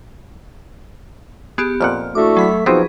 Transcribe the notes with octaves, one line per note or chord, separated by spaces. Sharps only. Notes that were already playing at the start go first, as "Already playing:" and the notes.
B3 G4 G#4
F2 A#2 F#5 F6
A3 D4 E4 F#4 D6
F#3 B5 B6
B2 F3 B3 C4 D#4 F#4 G#4